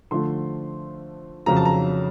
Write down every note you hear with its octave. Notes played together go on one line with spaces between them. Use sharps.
D3 F3 A3 C6
F2 C#3 F#3 A#5
A5
A#5